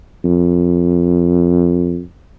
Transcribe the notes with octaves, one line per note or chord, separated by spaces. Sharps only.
F2